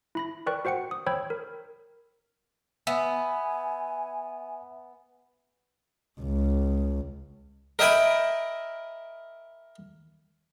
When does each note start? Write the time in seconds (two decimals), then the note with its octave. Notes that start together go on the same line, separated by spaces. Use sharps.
0.15 E4 B5 A#6
0.46 A#4 B4 D5 G5 C#6 F#6
0.65 F#4 C5 F#5 G5 C#7
0.91 D#6
1.06 C5 C#5 G5 B5 E6 G#6
1.30 A#4
2.87 B3 E5 G#5
6.20 C#2
7.79 A#4 D#5 E5 G5 G#5 B5